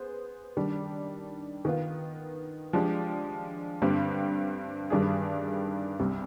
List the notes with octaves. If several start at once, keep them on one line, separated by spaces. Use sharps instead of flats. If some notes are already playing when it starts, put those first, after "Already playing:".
Already playing: B3 G#4 C5
D#3 G3 D4
D#3 B3 F4
F3 G#3 D4 G4
G2 D3 G3 C4
G2 D#3 G3 D4 G#4
C2 C3 G3